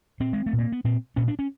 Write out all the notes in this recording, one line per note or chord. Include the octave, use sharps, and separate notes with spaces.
A#2 C4
G#3
A3
A#2
A#3
B3
A#2 C4
A#2 C#4
D4
C#4